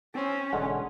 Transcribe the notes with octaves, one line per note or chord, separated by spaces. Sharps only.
C4 C#4
E1 D3 G#3 F#5